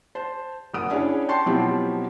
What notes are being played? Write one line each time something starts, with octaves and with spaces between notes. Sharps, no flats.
C5 A5
F#1 F#5 D#6 D7
C#4 D4 E4 G#4 C#5
G5 A5 C6 C#6 C7
B2 F3 F#3 C4 E4 G4